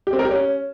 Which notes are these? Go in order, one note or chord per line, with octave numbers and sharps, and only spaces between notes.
G4
C4
A#4
G4
C#4